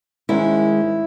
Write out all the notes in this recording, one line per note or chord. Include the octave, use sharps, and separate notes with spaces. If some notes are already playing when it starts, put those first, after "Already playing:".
G#2 D#3 G#3 C#4 E4